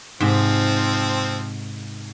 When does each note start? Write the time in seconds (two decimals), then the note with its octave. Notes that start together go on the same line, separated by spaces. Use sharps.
0.20 G#2 C3 F3 C4